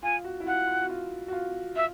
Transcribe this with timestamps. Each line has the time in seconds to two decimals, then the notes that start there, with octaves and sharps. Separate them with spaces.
0.03 F4 G#5
0.24 F#4
0.40 E4
0.46 F4 F#5
0.68 F4
0.82 F#4
0.89 F4
1.28 F#4
1.33 F4
1.76 F4 E5